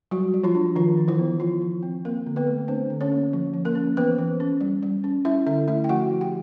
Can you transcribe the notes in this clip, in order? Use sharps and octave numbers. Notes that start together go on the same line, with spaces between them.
F#3 G3 F#4
G3
F3 F4
D4
D#3 F3 F4
D#3
E3 E4
B3
F3 F4
F3
C4
A#3 C4 A#4
D3
B3 B4
A3
C4 D4 C5
D3
C#4 C#5
A#3
F3
F3
A#3 A#4
C#4
E3 B3 B4
E3
C#4
G3
G3
C#4
C#4 E4 E5
D3 E4 E5
A3 E4 E5
G5
F3 F#4 F#5
F3
G4 G5